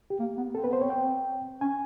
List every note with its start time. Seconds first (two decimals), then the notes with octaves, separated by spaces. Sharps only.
0.10 G4
0.19 A#3
0.37 B3
0.55 C4 A4
0.64 B4
0.67 B3
0.73 C5
0.80 C4 C#5
0.90 G5
1.61 C#4 G#5